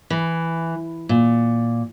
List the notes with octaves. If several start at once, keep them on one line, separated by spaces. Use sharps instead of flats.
E3
A#2